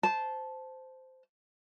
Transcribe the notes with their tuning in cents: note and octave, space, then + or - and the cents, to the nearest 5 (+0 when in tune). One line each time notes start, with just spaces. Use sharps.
C5 -10 A5 -10